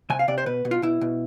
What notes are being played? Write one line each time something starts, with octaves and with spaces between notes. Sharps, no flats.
C3 G#5
F5
C3 D5
C5
B2 B4
B2
F4
B2 E4
B2